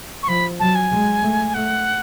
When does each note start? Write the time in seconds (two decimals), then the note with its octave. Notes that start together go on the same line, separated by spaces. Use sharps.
0.23 C#6
0.27 F3 B5
0.59 F#3 A5
0.75 G#5
0.91 G#3
1.22 A3
1.54 A3 F#5